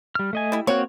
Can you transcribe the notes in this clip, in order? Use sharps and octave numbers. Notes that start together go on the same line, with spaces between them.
G3 F6
A3 D#5 G#5
G3 E4
A#3 C4 F#4 C#5